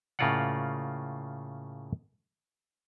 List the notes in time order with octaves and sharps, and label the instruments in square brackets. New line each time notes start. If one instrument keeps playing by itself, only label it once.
[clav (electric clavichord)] A2 C#3 A#3 F4 D5 F#5